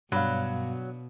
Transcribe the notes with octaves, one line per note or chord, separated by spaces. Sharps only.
G2 B2 F#3 D4 F5 B5